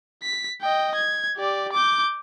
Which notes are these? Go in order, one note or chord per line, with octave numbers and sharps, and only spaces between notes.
B6
D#5 G5
G#6
G4 D5
D6 G6